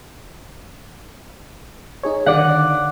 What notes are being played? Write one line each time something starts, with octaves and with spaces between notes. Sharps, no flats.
D#4 G#4 C#5
D3 D#3 D5 F#5